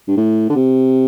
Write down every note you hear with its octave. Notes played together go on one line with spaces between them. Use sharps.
G2
A2
D3
C3